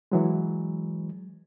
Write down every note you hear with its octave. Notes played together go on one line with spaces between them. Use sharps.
E3 F#3 G#3